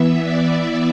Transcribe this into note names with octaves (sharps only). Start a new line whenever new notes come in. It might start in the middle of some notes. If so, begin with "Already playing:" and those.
Already playing: E3 B3 E5
D5